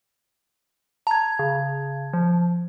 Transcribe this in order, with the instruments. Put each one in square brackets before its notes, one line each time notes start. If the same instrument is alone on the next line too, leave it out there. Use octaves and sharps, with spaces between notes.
[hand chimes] A5 G#6 [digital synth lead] A#5
[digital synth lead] C#3
F3